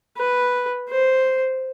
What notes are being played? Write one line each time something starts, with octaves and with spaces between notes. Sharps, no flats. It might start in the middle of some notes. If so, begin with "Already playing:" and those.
B4
C5